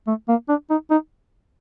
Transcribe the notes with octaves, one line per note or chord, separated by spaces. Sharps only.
A3
A#3
D4
D#4
D#4